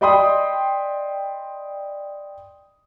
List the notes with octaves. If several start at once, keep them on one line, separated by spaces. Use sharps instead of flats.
D5 D#5 G5 B5 C6 D#6